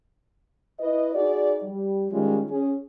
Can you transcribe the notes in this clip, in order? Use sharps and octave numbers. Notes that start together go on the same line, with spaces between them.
E4 B4 D#5
D#4 F#4 G#4 D5
G3
D#3 G3 G#3 C#4 F4
C#4 G#4